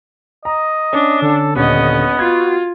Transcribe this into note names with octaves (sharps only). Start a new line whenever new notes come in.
D#5 A#5
C#4 D4
D3 A4
D#1 D3 B3 C#4 D#5
F4 F#4 G#6